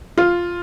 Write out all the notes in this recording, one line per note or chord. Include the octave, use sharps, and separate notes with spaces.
F4